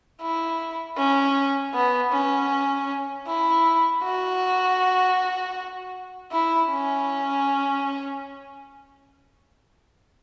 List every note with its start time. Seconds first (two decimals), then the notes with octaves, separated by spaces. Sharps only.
0.21 E4
0.98 C#4
1.74 B3
2.12 C#4
3.27 E4
4.03 F#4
6.32 E4
6.71 C#4